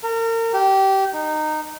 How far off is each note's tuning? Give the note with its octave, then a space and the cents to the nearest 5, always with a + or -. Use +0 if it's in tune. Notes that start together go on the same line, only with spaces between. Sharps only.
A#4 -35
G4 -20
D#4 -15